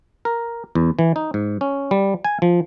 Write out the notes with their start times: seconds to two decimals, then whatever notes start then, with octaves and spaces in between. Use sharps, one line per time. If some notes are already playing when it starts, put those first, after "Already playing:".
0.25 A#4
0.75 E2
0.99 E3
1.16 D#4
1.34 G#2
1.61 C#4
1.91 G3
2.25 G#5
2.42 F3